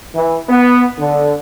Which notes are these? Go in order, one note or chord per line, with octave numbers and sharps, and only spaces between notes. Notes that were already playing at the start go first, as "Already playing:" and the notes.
E3
B3
D3